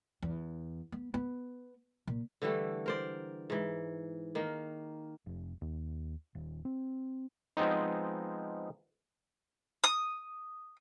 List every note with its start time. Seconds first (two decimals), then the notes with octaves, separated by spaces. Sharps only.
0.22 E2
0.92 B3
1.14 B3
2.07 A#2
2.42 D3 E3 G3 A3
2.86 A#4 C5 D5
3.50 G#2 E3
4.35 D#3 A#3
5.26 F1
5.61 D#2
6.35 D#1
6.65 C4
7.57 F3 G#3 B3 C4 D#4
9.84 D#6